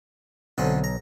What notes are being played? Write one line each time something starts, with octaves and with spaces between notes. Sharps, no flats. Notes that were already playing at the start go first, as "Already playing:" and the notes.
B1 D3 C4 C#4
A#5